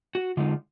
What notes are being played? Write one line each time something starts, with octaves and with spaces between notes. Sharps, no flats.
F#4
D3 G#3 D#4 F4